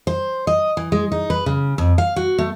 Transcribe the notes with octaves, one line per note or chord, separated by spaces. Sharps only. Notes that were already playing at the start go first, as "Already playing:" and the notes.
C5
D#5
E3
G#3
D#4
B4
C#3
F2
F5
F#4
A3